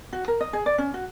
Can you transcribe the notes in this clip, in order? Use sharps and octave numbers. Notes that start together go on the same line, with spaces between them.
F#4
A#4
D#5
G#4
D5
C#4
F#4